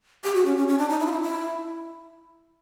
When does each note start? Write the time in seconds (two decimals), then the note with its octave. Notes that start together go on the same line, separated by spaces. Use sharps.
0.24 G4
0.35 F#4
0.45 C#4
0.57 C#4
0.68 C#4
0.79 D4
0.89 D#4
1.00 E4
1.06 F4
1.11 E4
1.22 E4